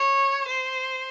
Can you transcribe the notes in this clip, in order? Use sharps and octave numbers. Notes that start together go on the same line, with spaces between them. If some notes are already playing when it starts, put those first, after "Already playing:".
Already playing: C#5
C5